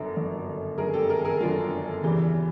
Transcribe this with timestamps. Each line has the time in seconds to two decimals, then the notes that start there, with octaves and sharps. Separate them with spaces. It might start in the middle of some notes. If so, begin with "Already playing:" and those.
Already playing: G1 F#2 D3 A#4
0.16 G1 F#2 D3
0.78 G1 F#2 D3 G#4 A#4
0.94 G4 A4
1.09 G#4 A#4
1.25 G#4 A#4
1.41 G1 F#2 D3 F4
2.03 E2 C#3 E3 G3